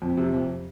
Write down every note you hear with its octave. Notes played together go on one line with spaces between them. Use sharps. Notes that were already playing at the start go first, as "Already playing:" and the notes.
F2
C3
F2